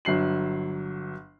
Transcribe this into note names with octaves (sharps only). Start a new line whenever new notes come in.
G1 F#3 C7 F#7